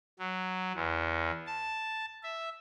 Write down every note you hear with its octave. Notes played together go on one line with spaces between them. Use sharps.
F#3
E2
A5
E5